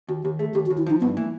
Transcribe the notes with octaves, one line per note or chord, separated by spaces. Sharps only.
D#2 F#4
D#2 G4
A3 G#4
D#2 G4
F#4
D#2
E4
F3 D#4
G2 B3
E3 A#3